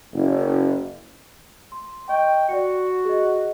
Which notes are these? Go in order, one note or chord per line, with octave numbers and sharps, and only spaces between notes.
F#1
C6
D#5 G5 C#6
F#4 D5 C#7
G#4 D#5